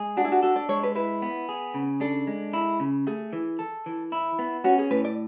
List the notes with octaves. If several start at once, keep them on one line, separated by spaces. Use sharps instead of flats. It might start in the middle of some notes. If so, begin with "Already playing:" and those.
Already playing: G#3 G#4
D4 F#4
E4
F#4
F#4 A4
D5
G#3 C#5
B4
E4 B4
B3
G#4
C#3
D4 A4
G#3
E4
C#3
A3 G#4
E3
A4
E3
E4
B3
C#4 F#4
G#4
A2 B4
D5